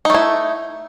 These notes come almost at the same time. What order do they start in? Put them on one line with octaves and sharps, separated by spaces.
D#4 A3 E4